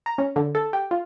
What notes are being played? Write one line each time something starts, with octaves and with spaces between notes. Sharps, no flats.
A#5
C#4
D3
A4
G4
F4